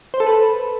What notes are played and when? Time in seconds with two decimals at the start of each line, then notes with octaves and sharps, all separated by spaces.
0.14 C5
0.20 A4
0.27 B4